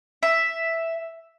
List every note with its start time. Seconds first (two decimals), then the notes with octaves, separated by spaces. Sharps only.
0.23 E5